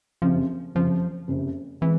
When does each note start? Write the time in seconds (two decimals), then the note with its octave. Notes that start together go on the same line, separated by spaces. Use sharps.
0.22 F#1 F2 C3 F3
0.75 F#1 F2 C3 F3
1.28 F#1 F2 C3
1.81 E3 G#3 C4